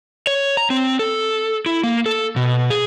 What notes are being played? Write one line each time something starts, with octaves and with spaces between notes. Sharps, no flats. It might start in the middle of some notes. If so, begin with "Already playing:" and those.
C#5
A#5
C4
A4
E4
A#3
A4
B2
G#4